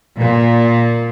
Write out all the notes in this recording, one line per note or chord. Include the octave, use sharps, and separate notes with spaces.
A#2